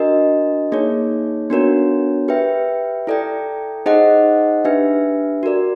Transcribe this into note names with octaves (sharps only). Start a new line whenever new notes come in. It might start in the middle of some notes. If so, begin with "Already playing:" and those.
Already playing: D4 F#4 A#4 D#5
A#3 D#4 G#4 C#5
B3 D4 F#4 A#4 C#5
G4 B4 E5 G5
E4 A4 D5 G5
D#4 G#4 C5 D#5 F#5
D4 G4 B4 E5
F#4 A#4 D5